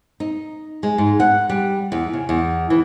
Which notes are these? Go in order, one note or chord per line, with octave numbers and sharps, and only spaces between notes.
D#4
G#3
G#2
F#5
G3
E2
C#3
E2
E3